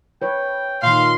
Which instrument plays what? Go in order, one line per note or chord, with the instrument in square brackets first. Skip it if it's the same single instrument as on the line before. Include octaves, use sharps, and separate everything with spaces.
[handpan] B4 C#5 [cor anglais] G5
[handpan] A#2 D#3 [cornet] F5 [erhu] C6